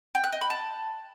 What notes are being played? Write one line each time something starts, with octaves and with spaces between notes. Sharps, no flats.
G5
F#6
D#5
B5
A5